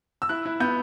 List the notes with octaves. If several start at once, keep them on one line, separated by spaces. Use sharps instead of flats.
E6
E4 F#6
E4
B3 G6